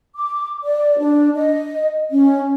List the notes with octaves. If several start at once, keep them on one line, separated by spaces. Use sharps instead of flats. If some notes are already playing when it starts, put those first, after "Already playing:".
D6
D5
D4
D#5
C#4